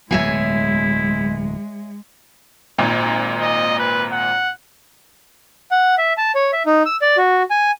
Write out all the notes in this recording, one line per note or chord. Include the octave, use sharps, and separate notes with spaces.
D1 E2 B2 G#3 E4 C#5 E5 G#5
G#1 A#2
D#5
B4
F#5
F#5
E5
A5
C#5
E5
D#4
E6
D5
F#4
G#5